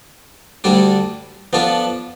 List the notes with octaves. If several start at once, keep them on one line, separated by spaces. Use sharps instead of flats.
D2 D3 G3 D4 A4
F3 B3 D4 F4 A4